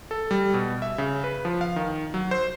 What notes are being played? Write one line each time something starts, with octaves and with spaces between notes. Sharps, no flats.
A4
G3
B2
E5
C#3
B4
F3
F5
D#3
F#3
C5